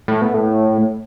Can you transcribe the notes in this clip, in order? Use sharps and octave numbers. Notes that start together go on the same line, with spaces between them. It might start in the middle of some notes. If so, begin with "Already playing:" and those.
A2
B2
A2